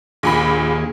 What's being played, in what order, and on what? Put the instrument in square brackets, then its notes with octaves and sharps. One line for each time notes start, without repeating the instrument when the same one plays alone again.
[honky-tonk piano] A#1 A#2 B5 [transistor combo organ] D#2 G#4